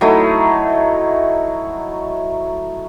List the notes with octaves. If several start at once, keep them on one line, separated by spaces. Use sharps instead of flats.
F#3 A3 D#4 E4